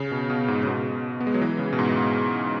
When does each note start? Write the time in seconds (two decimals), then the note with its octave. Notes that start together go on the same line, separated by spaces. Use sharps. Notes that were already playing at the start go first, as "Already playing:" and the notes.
Already playing: C#3
0.11 B2
0.30 B2
0.48 G#2
0.63 C#3
0.67 B2
1.20 B3
1.27 G#3
1.34 F#3
1.41 E3
1.59 C#3
1.73 B2
1.79 G#2